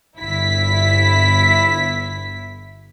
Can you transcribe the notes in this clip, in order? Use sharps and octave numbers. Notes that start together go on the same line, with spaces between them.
G1 E4 B6